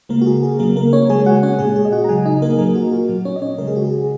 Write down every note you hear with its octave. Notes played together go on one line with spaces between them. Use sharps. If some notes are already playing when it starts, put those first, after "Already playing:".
C#3 G#3 A#3 A#4
F#4
G#4
G#4
C#3 F#3 A#3 A#4
A#3 A#4
C#4 C#5
C#3 G#3 G#4 G#5
F#4 F#5
C#4 C#5
A#2 G#3 G#4
G#4
D#5
F#4 F#5
A#5
C#3 F#3 G#4 G#5
D#4 D#5
A#3 A#4
A#2 F#3 A#3 A#4
F#4
F#4
A#2 F#3
C#4 C#5
D#5
C#4 C#5
C#3 G#3 A#4
G#4
F#4
G#4